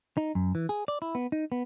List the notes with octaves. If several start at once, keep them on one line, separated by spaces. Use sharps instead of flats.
D#4
F#2
E3
G#4
D5
E4
B3
D#4
B3